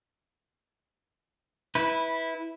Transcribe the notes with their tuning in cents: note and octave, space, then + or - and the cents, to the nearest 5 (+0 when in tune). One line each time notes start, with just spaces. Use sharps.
E4 -15 B4 +0